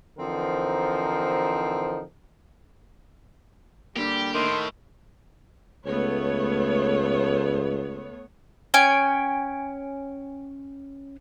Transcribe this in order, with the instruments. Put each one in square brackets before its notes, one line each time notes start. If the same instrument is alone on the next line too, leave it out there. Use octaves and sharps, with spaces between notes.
[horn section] D3 E3 F3 C4 D#4 A#4
[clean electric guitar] D3 A#3 [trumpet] G3 [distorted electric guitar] G4
[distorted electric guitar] A2 [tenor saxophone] D#3 [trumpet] C6
[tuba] C#2 [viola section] A3 B3 C#5
[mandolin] C#4 G5 G#5